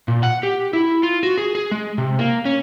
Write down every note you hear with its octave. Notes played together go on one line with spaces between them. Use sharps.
A#2
F#5
G4
E4
F4
F#4
G#4
G#4
G#3
C3
A#3
C#4